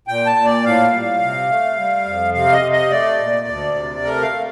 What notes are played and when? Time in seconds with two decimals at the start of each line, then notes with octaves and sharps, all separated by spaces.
0.08 A#2 G5
0.26 A5
0.36 A#2
0.45 D5
0.64 A2 F5
0.93 G3
1.21 C3
1.49 A3
1.77 G3
2.06 F2
2.34 C3 F5
2.53 D#5
2.62 C3
2.72 D#5
2.90 A3 D5
3.18 A#2
3.47 D2
3.75 C3
4.03 A3 A#4
4.22 F5
4.32 A3